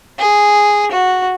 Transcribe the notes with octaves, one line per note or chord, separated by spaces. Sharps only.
G#4
F#4